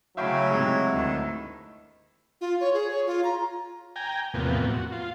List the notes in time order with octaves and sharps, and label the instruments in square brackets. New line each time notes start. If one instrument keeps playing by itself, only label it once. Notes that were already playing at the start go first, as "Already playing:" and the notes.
[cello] C#3 A3 [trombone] F#3 [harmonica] E4 [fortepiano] E5 F5 G5
[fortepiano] G#2 C3 G#3
[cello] D2 D#3
[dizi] F4
C#5
G#4
C#5
F4
A#5
[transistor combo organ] G5 G#5 A#5
E2 A2 C3 F3 A#3 B3
F#4
F4